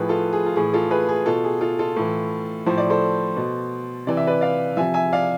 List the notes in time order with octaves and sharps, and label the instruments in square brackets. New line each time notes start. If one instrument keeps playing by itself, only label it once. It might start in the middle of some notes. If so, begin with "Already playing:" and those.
Already playing: [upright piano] A2 F3 G#4 B4
F4 A4
G#4
F4
A2 E3 G#4
F4 A4
G#4 B4
G#4
B2 F4 A4
G#4
F4 A4
F4 A4
A2 E3
A2 F3 C5
D5
A4 C5
B2
C3 E3 D5
E5
B4 D5
D5 F5
C3 F3 E5 G#5
E5 G#5
D5 F5